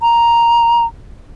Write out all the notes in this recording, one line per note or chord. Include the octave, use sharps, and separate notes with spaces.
A#5